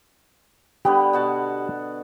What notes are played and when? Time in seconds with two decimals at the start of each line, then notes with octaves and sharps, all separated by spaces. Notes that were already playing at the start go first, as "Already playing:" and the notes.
0.85 D3 G3 B3 G4
1.13 B2 F#4 A5